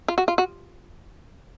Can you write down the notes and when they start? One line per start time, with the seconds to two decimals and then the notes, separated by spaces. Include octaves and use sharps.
0.08 F4
0.18 F#4
0.28 F4
0.38 F#4